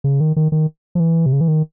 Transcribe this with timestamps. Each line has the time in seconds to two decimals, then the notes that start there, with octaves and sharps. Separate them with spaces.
0.04 C#3
0.20 D#3
0.36 D#3
0.52 D#3
0.95 F3
1.00 E3
1.26 C3
1.33 C#3
1.41 E3
1.48 D#3